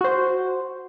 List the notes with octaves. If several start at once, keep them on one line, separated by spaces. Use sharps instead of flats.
F#4 C5